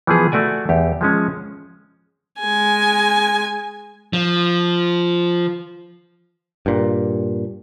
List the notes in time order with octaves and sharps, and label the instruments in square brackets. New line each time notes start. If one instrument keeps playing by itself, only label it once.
[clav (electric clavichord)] E3 F3 B3 G#4
A3 F#4 D5 G#5
E2 G4
F3 G#3 C#4
[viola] G#3 G#5
[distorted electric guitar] F3
[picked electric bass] G2 A#2